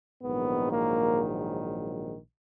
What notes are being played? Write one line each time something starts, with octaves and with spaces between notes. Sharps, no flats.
A#1 G#2 D#3 F#3 B3
A#3